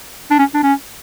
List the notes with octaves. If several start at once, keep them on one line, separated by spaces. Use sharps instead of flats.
D4
C#4
D4
C#4